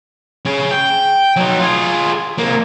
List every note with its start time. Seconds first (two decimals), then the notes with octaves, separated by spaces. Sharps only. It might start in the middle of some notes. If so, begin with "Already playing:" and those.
0.45 C#4 G#4
0.71 G5
1.36 F#3 D#4
1.60 F4 G#4
2.38 C3 A#3